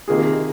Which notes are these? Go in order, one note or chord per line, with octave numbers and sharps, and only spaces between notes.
C3 D#3 A#3 F4 G#4